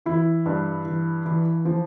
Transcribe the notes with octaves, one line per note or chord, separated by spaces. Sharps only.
E3 E4
G2
E3
E3
F3